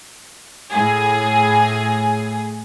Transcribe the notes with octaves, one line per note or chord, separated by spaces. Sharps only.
A2 G#4